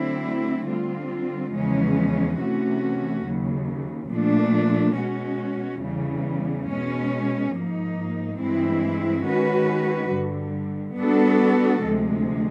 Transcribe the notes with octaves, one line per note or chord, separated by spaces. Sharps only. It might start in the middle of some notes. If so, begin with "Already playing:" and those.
Already playing: D3 F#3 A3 C4 E4
D3 G3 C4 F4
E2 C#3 F3 G#3 C#4
C3 E3 A3 C#4 F#4
D#2 C#3 F#3
A#2 F3 A3 D4
B2 G#3 C#4 F#4
E2 C#3 E3 G3
B2 G#3 C#4
G#2 F3 A#3 D#4
G2 E3 G#3 C4 E4
D#3 G#3 C#4 F#4 B4
G2 D3 G3
G3 B3 D4 F#4 A4
D2 C3 F3 G#3